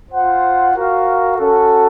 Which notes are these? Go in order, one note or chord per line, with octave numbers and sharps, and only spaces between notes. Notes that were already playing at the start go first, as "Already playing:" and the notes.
F4 C5 F#5
F#4 A#4 F5
C#4 F#4 A4